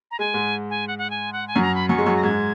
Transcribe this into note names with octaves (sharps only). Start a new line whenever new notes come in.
A#5
G#3 G#5
G#2 G#3
G#5
F#5
F#5
G#5
F#5
G#5
F#2 F#3
A#5
B5
F#2 F#3 C#6
G#3
F#2 F#3
A#6
G#2 G#3 G#6